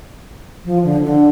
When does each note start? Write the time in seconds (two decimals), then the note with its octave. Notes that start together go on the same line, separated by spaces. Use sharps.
0.65 F3
0.84 D3
1.04 D3